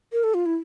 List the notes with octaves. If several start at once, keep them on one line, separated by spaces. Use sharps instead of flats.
A#4
A4
F4
E4